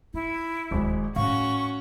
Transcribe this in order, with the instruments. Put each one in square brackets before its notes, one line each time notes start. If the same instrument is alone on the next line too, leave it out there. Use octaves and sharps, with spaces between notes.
[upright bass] D#4 [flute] E4
[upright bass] D#1 D2 [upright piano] G#1 G#3
[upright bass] A2 [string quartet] C#4 F#4 [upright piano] F5 [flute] C#6